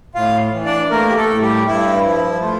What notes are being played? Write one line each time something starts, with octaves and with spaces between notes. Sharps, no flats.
A2 F4 F5
E3
D4 D5
A3 A#3 A#4
G4
A3 A4
A2
G3 G4
G2 E4
F3 E4
A3 F4